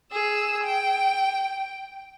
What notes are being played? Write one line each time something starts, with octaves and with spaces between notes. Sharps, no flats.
G#4 E6
G5